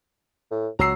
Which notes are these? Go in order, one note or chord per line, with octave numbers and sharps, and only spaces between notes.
A2
C#2 F#3 A#5 E6 C7